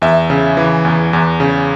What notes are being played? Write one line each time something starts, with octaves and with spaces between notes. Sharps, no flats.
E2 E5
C#3
E3
E2
E2
C#3